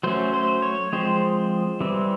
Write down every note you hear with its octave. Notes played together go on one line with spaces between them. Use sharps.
F#3 A3 C#4 C5
C5
C#5
F3 G#3 C4 C5
E3 G3 C4